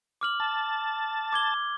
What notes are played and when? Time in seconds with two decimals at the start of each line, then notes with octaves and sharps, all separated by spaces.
0.21 D6 F6 F#7
0.40 A5
1.33 D6 G#6 G7